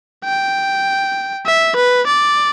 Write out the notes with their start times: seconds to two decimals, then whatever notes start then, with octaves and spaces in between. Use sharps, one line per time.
0.24 G5
1.46 E5
1.76 B4
2.07 D5